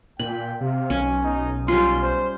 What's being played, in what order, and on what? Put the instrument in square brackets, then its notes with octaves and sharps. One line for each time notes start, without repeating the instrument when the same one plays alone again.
[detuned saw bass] A#2 [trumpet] G5 [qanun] B5
[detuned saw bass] C3 [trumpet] F5
[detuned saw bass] B1 [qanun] C#4
[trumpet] D#4
[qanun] G3 C#4 F4 [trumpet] C6
[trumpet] C5